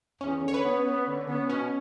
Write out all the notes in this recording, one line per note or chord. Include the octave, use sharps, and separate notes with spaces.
E2 C#4
D3
C#5
B4
B3
B3
D3
B3
B2 C#4